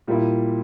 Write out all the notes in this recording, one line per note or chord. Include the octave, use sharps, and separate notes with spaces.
A#2 G3 A#3 E4